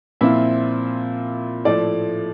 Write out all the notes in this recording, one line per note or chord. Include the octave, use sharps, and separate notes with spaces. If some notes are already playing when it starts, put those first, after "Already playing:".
A#2 F3 C4 E4 F4 E5
A2 F3 A3 D5